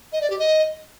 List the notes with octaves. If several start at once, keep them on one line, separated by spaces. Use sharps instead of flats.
D#5
D5
G4
D#5